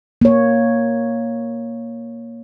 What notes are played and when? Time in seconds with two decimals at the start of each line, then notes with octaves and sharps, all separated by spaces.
0.21 A#3 C#5